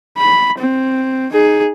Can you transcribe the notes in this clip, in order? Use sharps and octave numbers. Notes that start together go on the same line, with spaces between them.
B5
C4
D#4 G#4